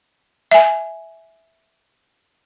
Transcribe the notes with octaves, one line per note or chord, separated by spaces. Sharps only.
E5 G#5